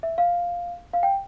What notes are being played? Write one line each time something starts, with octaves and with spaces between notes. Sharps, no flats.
E5
F5
F5
G5